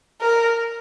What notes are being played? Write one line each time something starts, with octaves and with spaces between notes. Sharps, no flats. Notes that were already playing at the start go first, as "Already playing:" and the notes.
A#4